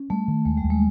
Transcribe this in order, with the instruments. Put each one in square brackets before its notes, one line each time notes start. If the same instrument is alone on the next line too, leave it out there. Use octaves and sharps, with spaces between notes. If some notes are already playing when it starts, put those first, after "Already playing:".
Already playing: [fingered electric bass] C#4
[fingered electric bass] G3 [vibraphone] A3
[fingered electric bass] D#3
[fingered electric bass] D#2 [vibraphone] G#3
[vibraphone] G3
[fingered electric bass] D#2
[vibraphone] G#3